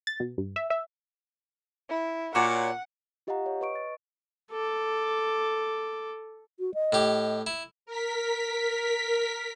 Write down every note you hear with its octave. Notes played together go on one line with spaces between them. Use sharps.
A6
B2
G2
E5
E5
E4
A#2 F#4 C#5 D5 F#5
F4 G4 D#5 F5 F#5 A#5
C#5
B4 D#5 C#6 D7
A6
A4 D6
F#4
D#5
A2 G4
E4
A#4 B6